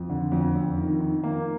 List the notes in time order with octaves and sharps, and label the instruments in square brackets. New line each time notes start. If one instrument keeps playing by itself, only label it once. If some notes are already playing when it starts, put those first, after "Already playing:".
Already playing: [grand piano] F2
D3
F2
F2
D#3
D#3
A#3